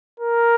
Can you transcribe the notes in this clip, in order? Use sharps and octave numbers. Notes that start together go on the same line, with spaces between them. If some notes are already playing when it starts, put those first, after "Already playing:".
A#4